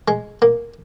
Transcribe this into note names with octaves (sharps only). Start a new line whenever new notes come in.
G#3
A#3